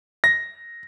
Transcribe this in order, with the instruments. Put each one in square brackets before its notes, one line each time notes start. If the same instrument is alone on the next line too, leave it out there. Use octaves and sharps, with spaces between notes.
[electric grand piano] A#6